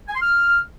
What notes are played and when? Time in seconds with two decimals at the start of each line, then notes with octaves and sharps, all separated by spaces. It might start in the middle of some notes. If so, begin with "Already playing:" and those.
0.08 G#5
0.15 C6
0.21 F6